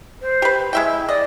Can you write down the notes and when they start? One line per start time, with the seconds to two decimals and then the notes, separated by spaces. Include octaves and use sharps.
0.21 C5
0.42 G4 B4
0.73 G#3 E4 E5 G5
1.09 D5 D#5